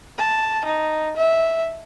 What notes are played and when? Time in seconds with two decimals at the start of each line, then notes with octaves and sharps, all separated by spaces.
0.19 A5
0.65 D#4
1.17 E5